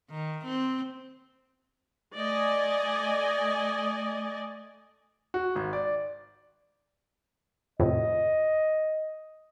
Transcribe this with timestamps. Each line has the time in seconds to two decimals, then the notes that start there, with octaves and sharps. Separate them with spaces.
0.10 D#3
0.45 C4
2.14 A3 D5 D#5 G#5
5.34 F#4
5.55 G#1
5.73 D5
7.80 F2 A2 C3 D#5